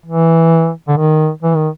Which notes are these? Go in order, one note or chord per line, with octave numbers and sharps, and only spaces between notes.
E3
D3
D#3
E3
D#3